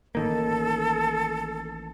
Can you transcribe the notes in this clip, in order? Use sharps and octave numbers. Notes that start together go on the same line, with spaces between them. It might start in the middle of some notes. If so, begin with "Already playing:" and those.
A1 D#3 A#3 A4